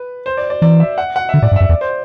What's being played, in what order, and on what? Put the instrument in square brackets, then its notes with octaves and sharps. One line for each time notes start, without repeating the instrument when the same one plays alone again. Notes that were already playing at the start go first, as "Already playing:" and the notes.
Already playing: [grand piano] B4
C5
D5
D5
[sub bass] E3 [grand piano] D5
[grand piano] E5
F#5
F#5
[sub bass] D3 [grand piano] E5
[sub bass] A2 [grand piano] D5
[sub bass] G2
[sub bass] F#2 [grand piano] E5
[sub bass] E2 [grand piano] D5
[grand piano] C5